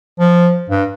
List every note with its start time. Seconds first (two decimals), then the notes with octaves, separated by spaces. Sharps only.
0.19 F3
0.70 G2